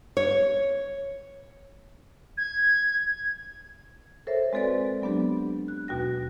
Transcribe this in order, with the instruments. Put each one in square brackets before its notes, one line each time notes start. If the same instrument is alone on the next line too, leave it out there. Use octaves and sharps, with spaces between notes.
[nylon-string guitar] C#5
[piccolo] G#6
[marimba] A4 A#4 C5 C#5 E5
G#3 C4 F#4 A4 B4 D5
F#3 B3 D4 G4
F#6
D#2 B2 F#4 G5 A#6